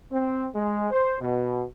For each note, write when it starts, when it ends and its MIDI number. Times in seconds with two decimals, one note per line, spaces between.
0.11 0.47 60
0.55 0.90 56
0.91 1.17 72
1.20 1.64 47